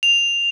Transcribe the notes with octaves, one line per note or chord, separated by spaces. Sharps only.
F7